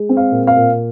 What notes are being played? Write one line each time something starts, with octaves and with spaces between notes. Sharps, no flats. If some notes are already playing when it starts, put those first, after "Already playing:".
Already playing: G#3
C4
F5
A#2
F5
A#2